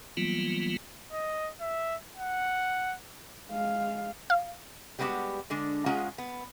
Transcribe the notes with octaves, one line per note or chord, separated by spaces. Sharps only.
E3 F#3 G3 A#3 B3 F4
D#5
E5
F#5
G#3 F5
F5
G3 G#3 B3 D#4 F#4 G4
D3 G#3 D4
G#3 C#4 F4 G#4 F#5 A#5
B3